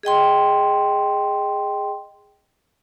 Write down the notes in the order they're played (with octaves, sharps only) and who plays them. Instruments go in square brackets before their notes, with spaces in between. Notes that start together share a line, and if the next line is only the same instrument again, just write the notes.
[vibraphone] G#4 D#5 G5 C6